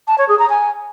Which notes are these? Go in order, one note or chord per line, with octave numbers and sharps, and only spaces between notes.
A5
C#5
G#4
A#5
G#5